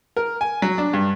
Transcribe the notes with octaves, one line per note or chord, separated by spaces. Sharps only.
A#4
G#5
F#3
D4
G2